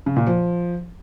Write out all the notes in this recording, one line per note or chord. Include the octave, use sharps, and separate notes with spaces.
C#3
A#2
F3